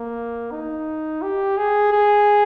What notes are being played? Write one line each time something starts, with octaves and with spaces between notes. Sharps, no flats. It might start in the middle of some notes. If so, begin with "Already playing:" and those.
Already playing: A#3
D#4
G4
G#4
G#4